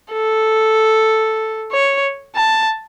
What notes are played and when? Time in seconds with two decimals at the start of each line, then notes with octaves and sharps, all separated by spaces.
0.12 A4
1.72 C#5
2.36 A5